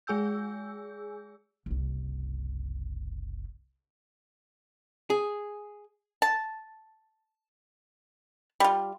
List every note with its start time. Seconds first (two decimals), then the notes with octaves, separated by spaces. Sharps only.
0.07 G#3 G#4 G#5 E6 G6
1.66 F#1 C2
5.10 G#4
6.22 A5
8.60 G3 F4